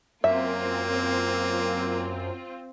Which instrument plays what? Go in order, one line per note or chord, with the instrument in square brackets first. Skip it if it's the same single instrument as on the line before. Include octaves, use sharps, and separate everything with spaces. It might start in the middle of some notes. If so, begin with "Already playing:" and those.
[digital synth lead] F#2 [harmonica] A#3 [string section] C4 F4 [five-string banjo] E5